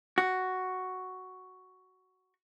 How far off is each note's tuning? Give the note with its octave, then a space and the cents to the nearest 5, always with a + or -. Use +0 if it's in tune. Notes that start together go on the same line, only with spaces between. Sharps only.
F#4 +5